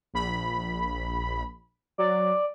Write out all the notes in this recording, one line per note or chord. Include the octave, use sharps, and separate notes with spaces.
A#1 B5
F#3 D5